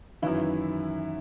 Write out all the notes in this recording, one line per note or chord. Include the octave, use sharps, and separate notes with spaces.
F#2 D#3 E3 E4